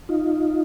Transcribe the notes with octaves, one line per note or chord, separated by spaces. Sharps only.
D#4 F4